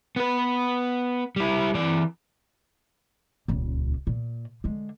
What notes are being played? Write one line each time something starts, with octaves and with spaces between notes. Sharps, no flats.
B3 B4
G3 E4
E3 D5
D#1 C#2
A#2
D3 G#3